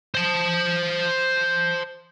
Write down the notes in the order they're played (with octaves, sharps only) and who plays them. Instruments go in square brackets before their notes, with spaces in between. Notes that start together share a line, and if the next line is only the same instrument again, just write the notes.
[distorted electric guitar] C5 A5